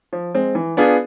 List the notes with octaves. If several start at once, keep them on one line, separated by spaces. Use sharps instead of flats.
F3
G#3 C4
E3
B3 D4 F4 G#4